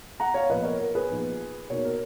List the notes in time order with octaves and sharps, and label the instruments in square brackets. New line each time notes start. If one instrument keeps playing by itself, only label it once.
[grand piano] F#5 A#5
C#5 F5
A#2 F3 B3 B4 D#5
A#4 C#5
A#4
G#4 B4
A#2 F3 B3 D#4
B2 A#3 D#4 A#4 C#5
A#4